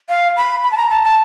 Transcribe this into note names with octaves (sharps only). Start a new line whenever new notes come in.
F5
B5
B5
A5
A#5
A5
A5